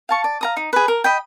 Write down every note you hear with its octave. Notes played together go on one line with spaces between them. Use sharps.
F5 A5 C#6
D5
F5 A#5 D#6
D#4
G#4 B4
A#4
D#5 G5 B5